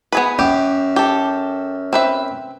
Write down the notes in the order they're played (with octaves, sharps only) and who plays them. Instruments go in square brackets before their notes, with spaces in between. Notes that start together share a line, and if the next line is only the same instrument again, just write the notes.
[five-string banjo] B3 G#4 B4
[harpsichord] F#2 [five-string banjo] G4
[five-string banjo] G4 A4
C4 B4 E5